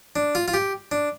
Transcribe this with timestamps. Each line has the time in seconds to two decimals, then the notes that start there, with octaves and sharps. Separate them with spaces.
0.16 D4
0.35 F4
0.48 F4
0.54 G4
0.92 D4